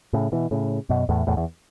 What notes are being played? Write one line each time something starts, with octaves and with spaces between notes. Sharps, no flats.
A2 C#3
B2 E3
A2 C#3
F#2 B2
E2 A2
E2 A2
E2